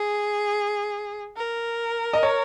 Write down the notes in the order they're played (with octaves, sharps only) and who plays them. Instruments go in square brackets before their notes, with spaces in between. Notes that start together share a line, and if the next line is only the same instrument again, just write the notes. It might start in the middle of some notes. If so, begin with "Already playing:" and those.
Already playing: [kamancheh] G#4
A#4
[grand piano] D#5
C#5